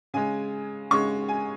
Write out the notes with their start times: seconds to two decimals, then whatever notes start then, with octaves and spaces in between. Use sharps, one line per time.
0.14 C#3 G#3 G#5
0.91 C#3 G#3 C#6
1.29 G#5